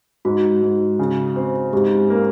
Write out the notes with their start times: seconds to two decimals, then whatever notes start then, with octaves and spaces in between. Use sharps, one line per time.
0.25 G#2 F#4
0.63 G#2
0.99 C#3
1.36 C4
1.73 G#2 G4
2.10 A#3